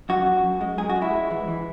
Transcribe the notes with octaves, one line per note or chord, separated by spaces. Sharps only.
F#2 F#4
F#2
F#2
G#3
F#2 G#4
F#4
G#3
E4
G#3
E3
E3